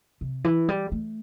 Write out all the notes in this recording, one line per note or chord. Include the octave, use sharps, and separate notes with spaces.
C3
E3
G3
A3